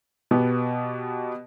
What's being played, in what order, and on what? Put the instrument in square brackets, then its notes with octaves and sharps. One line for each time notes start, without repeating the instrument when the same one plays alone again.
[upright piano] B2 B3 G4